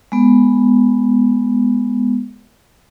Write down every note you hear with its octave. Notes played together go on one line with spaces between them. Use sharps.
G#3 B3